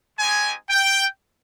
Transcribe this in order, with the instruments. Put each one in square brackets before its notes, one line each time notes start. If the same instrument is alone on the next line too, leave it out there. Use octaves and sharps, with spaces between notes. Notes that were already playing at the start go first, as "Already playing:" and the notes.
[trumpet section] G#3 C4 D#4 G4 G#5
G5